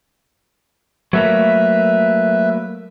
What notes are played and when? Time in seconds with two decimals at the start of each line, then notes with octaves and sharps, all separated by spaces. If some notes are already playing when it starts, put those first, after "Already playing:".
1.13 F#3 A3 A#3 B4 E5